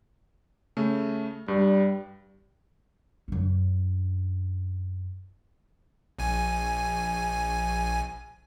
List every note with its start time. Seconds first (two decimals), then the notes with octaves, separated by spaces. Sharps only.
0.77 C#3 A3
1.48 G2 G3
3.28 F#2 D4
6.19 A#1 G#5